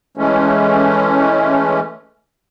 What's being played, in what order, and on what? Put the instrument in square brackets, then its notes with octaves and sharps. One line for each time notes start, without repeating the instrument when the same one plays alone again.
[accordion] E3 G#3 A3 C#4